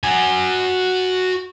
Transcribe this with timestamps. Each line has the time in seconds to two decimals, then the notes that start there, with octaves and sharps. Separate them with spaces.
0.04 F#4 G#5